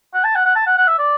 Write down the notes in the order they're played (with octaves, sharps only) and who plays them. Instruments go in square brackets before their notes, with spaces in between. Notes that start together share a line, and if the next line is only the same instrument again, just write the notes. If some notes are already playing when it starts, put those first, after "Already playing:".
[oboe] F#5
A5
F#5
F#5
A5
F#5
F#5
E5
D5